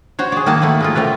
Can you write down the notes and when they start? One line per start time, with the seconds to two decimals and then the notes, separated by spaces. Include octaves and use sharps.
0.19 F#4 C5 C#5
0.32 G#4 D5
0.46 D#3 A#3 F#5 A5
0.61 A3 A#3 B4 F#5
0.80 G#3 A3 F4
0.95 G3 A3 F4 A#4 B4